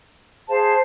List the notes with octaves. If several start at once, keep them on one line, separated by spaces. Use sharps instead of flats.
G#4 C5 F5 A5